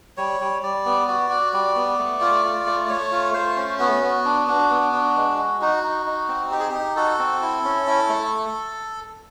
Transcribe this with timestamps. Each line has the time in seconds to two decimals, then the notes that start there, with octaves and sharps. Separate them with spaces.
0.17 G3 C#5
0.40 G3
0.63 G3 D5
0.86 B3
1.08 F#4 D5
1.30 F#4
1.53 G3 D5
1.75 B3
1.99 A3
2.21 F4
2.44 F4
2.66 A3
2.85 D5
2.89 A3 C#5
3.12 F4
3.34 A3 C5
3.57 C#4
3.79 B3 F#4
4.03 B3
4.25 D4
4.47 D4
4.70 B3
4.92 D4
5.16 G#3
5.38 F#4
5.61 D#4 F#4
5.83 D#4
6.06 D#4
6.28 C4
6.51 D#4 G4
6.59 G#4
6.69 D#4 G4
6.96 F#4 A4
7.19 C4
7.42 E4
7.64 C#4
7.87 E4
8.09 A3